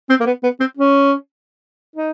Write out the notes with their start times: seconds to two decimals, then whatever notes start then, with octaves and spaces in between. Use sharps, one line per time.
0.09 C4
0.20 A#3
0.26 B3
0.43 B3
0.60 C4
0.77 C#4
1.96 D#4